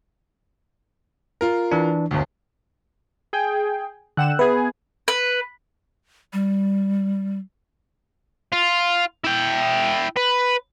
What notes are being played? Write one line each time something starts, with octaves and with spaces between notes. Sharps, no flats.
F4 A#4
E3 D4
G1 D2
G#4 G5
D3 F#5 G5 E6 F#6 E7
B3 G#4 B4 E5
B4
G3
F4
E4 G5
B4